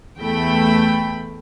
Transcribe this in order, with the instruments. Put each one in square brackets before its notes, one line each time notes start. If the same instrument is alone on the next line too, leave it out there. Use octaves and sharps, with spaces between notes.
[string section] E2 A3 G5 B5